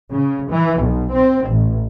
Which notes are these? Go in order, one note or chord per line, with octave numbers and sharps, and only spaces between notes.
C#3
E3
B1
C4
A1